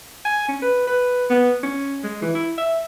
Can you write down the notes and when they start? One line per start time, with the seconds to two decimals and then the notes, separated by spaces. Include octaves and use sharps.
0.25 G#5
0.48 C#4
0.62 B4
0.87 B4
1.30 B3
1.63 C#4
2.03 G#3
2.22 E3
2.35 E4
2.58 E5